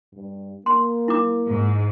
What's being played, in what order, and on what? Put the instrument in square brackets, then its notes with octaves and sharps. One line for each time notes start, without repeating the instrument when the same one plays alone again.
[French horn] G2
[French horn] A#3 [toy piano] C6
[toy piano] E4 D6
[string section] G#2